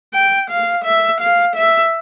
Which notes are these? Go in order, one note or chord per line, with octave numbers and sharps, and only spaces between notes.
G5
F5
E5
F5
E5